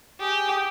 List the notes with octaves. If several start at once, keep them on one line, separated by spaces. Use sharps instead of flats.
G4 G#4
G4